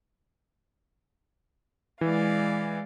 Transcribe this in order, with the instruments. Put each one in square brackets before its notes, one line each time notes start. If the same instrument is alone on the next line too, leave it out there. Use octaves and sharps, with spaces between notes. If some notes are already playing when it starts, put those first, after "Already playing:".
[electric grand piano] E3 [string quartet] G#3 D5 F5